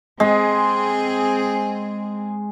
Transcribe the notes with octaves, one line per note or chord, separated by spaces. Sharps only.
G#3 C4 G#4